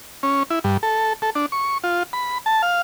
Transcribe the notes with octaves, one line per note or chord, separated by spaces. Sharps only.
C#4
E4
G2
A4
A4
D4
C#6
F4
B5
A5
F5